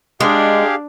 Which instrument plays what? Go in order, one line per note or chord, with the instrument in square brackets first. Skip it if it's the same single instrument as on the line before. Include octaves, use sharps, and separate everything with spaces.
[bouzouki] G#3 [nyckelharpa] D4 [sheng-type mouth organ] G4 G#4 F5